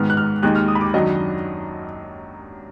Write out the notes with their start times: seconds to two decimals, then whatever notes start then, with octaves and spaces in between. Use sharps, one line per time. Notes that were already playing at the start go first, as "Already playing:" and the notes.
Already playing: G#2 D#3 G#3 B3 F6
0.10 F#6
0.17 F6
0.43 D#2 D#3 G#3 D#4 F#6
0.56 F6
0.68 D#6
0.75 B5
0.81 D6
0.94 F#2 D#3 F#3 D4 D#5